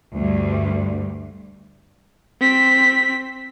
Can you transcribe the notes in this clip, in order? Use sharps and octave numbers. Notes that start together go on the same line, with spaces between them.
D2 G2
C4 B6